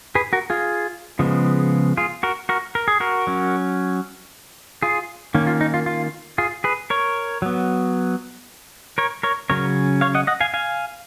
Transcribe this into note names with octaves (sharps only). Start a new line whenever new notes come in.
G#4 B4
F#4 A#4
F4 G#4
C#3 F3 G#3 B3
F4 G#4
F#4 A#4
F#4 A#4
A#4
G#4
F#4 A#4
F#3 C#4
F4 G#4
D#3 A#3 C#4
F4
D#4
F4
F4
F4 G#4
G#4 B4
A#4 C#5
F#3 B3
A#4 C#5
A#4 C#5
C#3 F#3 C#4 A#4 C#5
C#5 F5
D#5 F#5
D#5 F#5
F5 G#5
F5 G#5